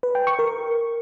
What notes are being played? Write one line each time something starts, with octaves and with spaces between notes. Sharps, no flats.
B4
G5
C#6
A#4